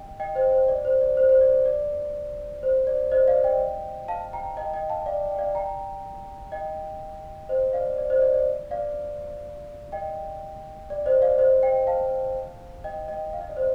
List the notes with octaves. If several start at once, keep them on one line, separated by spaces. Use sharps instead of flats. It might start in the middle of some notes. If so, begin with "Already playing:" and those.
Already playing: D#5 G5
D#5 G5
C5 D#5
C5
D5
C5
D5
C5
C5
D5
D5
C5
D5
C5 D#5
D5 F5
D#5 G5
F5 A5
G5 A#5
D#5 G5
D#5 G5
F5 A5
D5 F5
G5
D5 F5
G5 A#5
D#5 G5
C5 D#5
D5 F5
D5
C5 D#5
D5
D5
D5 F5
D#5 G5
D5
C5 D#5
D5 F5
C5 D#5
D#5 G5
F5 A5
D#5 G5
D#5 G5
F5
D#5
D5
C5 D#5